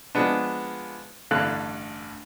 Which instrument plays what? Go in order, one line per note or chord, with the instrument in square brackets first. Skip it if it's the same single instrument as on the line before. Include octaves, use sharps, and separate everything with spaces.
[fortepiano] F3 G#3 B3 D4
A1 G2 D3 A4 F5 F#6